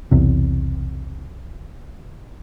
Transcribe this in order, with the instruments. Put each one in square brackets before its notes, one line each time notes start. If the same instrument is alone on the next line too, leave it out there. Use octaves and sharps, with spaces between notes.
[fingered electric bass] B1 E2 C3